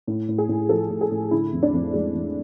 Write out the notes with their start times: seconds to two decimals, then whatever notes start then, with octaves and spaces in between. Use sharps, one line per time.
0.07 A2
0.28 A2
0.38 G#4
0.49 A2
0.69 F3 A4
0.90 A2
1.01 G#4
1.11 A2
1.31 D3 E4
1.53 F2
1.63 D4
1.74 F2
1.94 F2 G#3
2.15 F2